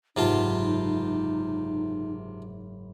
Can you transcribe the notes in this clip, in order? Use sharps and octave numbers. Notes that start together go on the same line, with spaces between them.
F#1 G#2 C3 D#4 F4 A5 B5